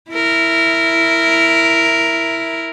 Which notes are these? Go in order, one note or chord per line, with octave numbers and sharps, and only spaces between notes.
E4 A#4